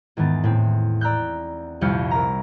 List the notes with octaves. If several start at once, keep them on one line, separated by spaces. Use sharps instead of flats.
E2 G#2 D#3 B3 A6
A2 C4
D5 A#5 E6 F#6 G6
D#1 C2 F2 F6 G6 C#7
A#4 E5 A#5